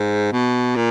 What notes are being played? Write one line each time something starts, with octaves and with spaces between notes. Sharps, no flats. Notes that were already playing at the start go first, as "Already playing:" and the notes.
Already playing: G#2
B2
A#2